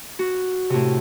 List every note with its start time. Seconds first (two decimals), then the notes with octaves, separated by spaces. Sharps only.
0.19 F#4
0.70 A2 C3